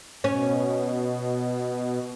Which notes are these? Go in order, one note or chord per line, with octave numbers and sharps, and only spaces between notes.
B2 C#4